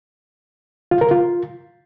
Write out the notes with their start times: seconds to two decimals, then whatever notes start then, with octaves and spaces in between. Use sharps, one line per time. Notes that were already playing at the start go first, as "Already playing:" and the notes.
0.91 F4
1.01 A#4
1.11 F4